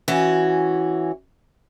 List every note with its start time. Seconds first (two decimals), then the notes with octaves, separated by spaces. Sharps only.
0.08 E3 C#4 F#4